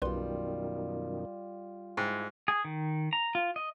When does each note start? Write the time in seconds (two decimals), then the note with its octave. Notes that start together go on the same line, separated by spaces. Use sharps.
0.02 B1 F#2 B2 D#3 G3 F4 B4 C6
1.97 G#2 E4 G5
2.48 G#4
2.65 D#3
3.13 A#5
3.35 F4
3.56 D#5